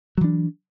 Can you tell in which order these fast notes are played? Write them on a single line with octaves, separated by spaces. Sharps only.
F#3 E3 D4